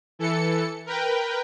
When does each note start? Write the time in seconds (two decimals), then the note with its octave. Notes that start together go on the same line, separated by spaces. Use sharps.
0.19 E3 A4 C#7
0.86 A#4 B4 G5